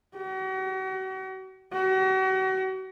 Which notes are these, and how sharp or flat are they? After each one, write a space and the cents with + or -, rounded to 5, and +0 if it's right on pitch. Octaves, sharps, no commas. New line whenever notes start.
F#4 +40
F#4 +40